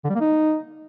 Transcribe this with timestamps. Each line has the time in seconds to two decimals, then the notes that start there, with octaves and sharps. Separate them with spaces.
0.04 D3
0.10 G3
0.15 A#3
0.21 D#4